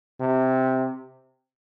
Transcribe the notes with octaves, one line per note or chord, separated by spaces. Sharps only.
C3